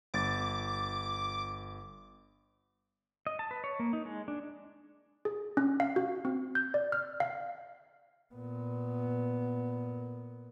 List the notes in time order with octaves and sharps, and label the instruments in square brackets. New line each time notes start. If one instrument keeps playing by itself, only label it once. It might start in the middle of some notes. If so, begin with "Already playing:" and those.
[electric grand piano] G1 A6 [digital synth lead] D6
[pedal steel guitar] D#5
A5
B4
C#5
A#3
D#4
G#3
D4
[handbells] G#4
C#4
F5
F#4
C4
G6
D5
F6
F5
[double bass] A#2 B3